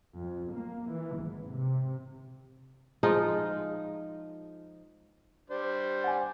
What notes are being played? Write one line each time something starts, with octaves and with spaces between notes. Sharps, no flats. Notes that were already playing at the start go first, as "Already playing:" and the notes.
F2
A#3
E3
G#1
C3
F3 G#3 D#4 F4
G3 D4 C5
F#5 G#5